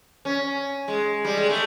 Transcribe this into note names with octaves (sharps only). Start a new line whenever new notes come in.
C#4
G#3
G3
G#3
A3